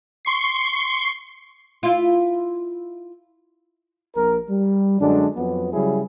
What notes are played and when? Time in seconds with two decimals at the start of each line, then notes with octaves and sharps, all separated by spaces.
0.25 C6 C#6 C7
1.83 E4 F4
4.15 A#1 A#4
4.50 G3
5.00 F#2 D3 G#3 D4
5.36 F2 F#3 B3
5.73 C#3 F#3 G3 E4 G#4